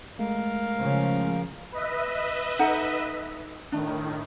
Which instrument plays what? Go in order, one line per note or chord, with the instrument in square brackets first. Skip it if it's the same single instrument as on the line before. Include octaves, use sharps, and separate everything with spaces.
[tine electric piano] G#3 A3 [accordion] A#4 F5
[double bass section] C#3 F3 C#4
[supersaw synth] B4 D#5 E5
[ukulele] D#4 A4 F#5
[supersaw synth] A2 D#3 [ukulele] D4